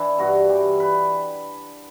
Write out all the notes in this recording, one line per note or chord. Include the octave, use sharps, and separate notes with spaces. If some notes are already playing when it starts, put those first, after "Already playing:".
Already playing: E3 D4
G2 F#4
E3 G4
B4